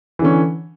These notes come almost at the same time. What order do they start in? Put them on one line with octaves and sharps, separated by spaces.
E3 D3 C#4